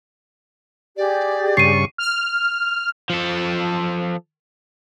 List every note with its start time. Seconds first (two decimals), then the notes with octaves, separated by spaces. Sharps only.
0.97 G4 G#4 D5
1.57 G2 C#3 C#6 C7 D#7
1.98 F6
3.10 F3 A4